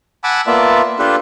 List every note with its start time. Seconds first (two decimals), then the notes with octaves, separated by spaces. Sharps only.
0.24 F#5 G#5 A5 B5 D6 E6
0.47 A#3 B3 F4 D5 E5 A5
0.99 D4 F4 G4 A4 B4